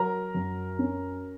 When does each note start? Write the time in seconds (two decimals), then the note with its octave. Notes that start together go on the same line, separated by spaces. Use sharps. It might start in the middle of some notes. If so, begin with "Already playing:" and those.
Already playing: F#3 A#4 A#5
0.34 F#2
0.79 C#4